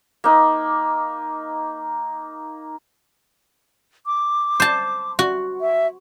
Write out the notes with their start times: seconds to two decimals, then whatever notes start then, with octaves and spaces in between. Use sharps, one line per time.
0.24 A#3 D#4
4.06 D6
4.60 C5 A5
5.19 F#4
5.61 E5